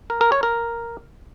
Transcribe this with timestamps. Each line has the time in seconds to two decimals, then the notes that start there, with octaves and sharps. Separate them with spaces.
0.10 A#4
0.21 A#4
0.32 C#5
0.43 A#4